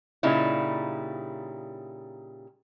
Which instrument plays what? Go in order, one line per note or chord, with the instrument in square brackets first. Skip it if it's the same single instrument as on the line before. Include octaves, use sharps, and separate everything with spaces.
[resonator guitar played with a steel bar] A#2 C#3 G3 D#4 E4